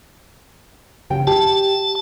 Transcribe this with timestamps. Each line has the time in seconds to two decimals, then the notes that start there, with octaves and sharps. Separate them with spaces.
1.10 C#3 G4 G5
1.27 G4 A5